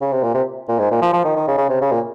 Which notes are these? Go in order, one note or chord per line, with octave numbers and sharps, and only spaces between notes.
C#3
C3
A#2
C3
A#2
G#2
A#2
F3
F3
D#3
D#3
C#3
C#3
C3
C#3
A#2